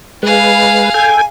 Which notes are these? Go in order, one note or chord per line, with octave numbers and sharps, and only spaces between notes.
G#3 G#4 B4 F5
A4 G5 G#5 G#6